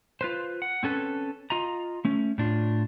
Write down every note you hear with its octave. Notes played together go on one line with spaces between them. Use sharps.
F4 B4 C5
F#5
C4 C#4 A4 B4
F4 D#5 A#5
A3 C#4
A2 D4 F4